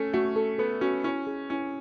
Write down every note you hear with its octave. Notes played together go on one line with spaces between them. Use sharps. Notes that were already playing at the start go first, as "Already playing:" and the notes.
Already playing: A3 C#4 A4
A3 F#4
A4
B3 A4
C#4 F#4
C#4 E4
G#4
C#4 E4